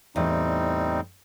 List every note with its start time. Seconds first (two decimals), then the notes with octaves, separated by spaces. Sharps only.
0.16 E2 A2 G3 C4 D#4